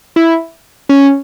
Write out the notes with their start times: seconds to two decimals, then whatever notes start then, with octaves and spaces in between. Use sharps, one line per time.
0.16 E4
0.89 C#4